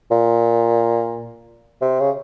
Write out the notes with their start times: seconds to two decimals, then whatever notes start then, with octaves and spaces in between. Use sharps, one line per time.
0.11 A#2
1.82 C3
2.00 C#3